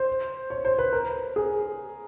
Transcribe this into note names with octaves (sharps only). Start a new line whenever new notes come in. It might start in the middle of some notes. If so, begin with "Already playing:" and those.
Already playing: C5
C#5
C5
B4
A#4
G#4